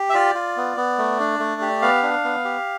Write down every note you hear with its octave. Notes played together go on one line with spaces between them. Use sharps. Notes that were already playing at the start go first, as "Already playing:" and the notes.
Already playing: G4
E5
F4 D5
F4
B3
B3
A3
D4
A3
G4
B3 F5
D4
B3
G4